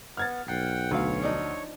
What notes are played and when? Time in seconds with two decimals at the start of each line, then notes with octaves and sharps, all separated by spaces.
0.17 B3 F6 G#6 A6
0.48 B1 F#5 G5 C7
0.91 D2 B4 C#5 F5
1.22 F3 D4 D#4